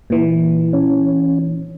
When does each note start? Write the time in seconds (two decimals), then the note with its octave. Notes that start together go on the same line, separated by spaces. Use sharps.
0.10 A#2 E3
0.73 C#4